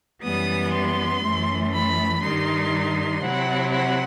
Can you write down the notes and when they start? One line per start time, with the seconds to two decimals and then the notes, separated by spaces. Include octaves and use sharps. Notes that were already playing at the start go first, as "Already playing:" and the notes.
0.23 F#2 E3 G3 B3 D#6
0.74 C6
1.23 F#2 E3 A3
1.74 B5
2.24 G2 D#3 G3 D#4 C6
3.22 C3 F#3 C4 E4 F#5
3.72 F#5